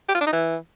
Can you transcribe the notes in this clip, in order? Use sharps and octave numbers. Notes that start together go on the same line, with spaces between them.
G4
F4
D4
D#4
E3